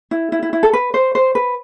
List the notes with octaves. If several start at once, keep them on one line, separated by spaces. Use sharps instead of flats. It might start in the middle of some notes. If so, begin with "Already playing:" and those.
E4
E4
E4
E4
A4
B4
C5
C5
B4